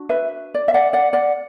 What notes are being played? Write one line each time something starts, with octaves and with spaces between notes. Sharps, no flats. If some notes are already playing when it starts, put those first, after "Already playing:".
Already playing: D4 F#4
B4 E5
D5
E5
D5 F#5
D5 F#5
D5 F#5